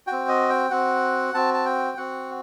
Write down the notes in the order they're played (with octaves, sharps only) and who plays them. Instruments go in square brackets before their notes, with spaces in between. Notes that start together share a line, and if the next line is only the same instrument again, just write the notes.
[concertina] F#4 G5
C4
D#5
G5
C4 F#4 F#5
C4 F#4 A5
A5
G5
C4 F#4 F#5